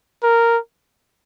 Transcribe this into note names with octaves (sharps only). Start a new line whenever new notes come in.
A#4